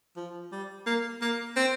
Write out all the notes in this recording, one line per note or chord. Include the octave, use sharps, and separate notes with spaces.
F3
G3
A#3
A#3
C4